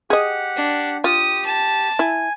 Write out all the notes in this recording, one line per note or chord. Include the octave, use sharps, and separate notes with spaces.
G4 G#4 D#5 F#5
D4
F4 G4 D#6
A5
E4 G#5